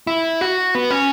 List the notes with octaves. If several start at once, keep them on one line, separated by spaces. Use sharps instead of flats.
E4
F#4
B3
C#4